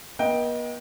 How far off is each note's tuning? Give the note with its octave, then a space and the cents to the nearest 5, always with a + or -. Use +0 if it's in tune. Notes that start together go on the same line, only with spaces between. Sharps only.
B3 -45 D#5 +10 G5 +0